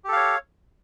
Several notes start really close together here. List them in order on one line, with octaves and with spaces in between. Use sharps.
G4 A4 F5 C#5